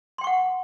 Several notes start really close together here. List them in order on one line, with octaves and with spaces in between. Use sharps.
C6 G5 C#6 F#5